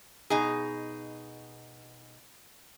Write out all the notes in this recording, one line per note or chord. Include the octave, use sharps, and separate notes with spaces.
B2 D#4 G#4